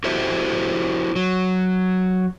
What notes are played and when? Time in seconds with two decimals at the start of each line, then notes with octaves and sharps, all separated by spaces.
0.04 E4 F#4 G4 A4 C5 E5
1.16 F#3